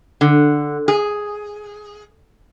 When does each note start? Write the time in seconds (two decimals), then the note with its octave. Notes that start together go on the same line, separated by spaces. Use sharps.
0.21 D3
0.88 G#4